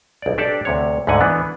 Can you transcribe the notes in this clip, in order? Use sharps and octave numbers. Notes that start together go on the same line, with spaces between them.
B1 D5
D4 G4 A4 D5 A5
D2 C3 C#5
D2 G#2 D3 F#5 G#5
E3 B3 D4